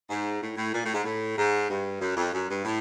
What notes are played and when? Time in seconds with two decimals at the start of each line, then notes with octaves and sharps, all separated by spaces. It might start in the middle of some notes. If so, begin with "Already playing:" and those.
0.09 G#2
0.42 A2
0.57 A2
0.74 A#2
0.84 A2
0.93 G#2
1.05 A2
1.37 G#2
1.69 G2
2.01 F#2
2.17 F2
2.33 F#2
2.50 G2
2.65 A2